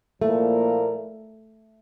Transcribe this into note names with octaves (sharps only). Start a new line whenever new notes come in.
A#2 F3 A3 A#3 E4 A#4